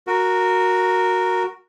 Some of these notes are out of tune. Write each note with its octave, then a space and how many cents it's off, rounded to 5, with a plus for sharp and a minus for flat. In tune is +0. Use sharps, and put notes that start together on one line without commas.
F#4 -5 A#4 +0